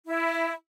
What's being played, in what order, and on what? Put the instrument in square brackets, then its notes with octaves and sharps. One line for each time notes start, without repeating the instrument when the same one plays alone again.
[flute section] E4